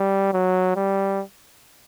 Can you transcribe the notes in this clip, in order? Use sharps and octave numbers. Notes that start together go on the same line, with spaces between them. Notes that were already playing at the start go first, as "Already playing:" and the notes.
Already playing: G3
F#3
G3